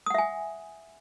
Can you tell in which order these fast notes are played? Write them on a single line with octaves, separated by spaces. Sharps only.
D#6 F#5 E5 G#5